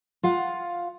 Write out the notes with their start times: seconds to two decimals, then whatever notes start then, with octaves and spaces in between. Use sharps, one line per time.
0.23 F4 F5 F#5